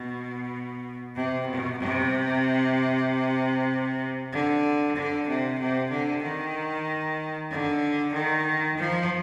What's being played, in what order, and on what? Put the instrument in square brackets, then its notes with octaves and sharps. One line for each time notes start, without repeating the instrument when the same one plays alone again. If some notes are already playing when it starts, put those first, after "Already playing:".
Already playing: [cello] B2
C3
B2
C3
D3
D3
C3
C3
D3
D#3
D3
D#3
F3